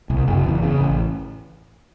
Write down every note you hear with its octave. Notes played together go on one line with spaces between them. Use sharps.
C2
F#1
E2
C#3
A1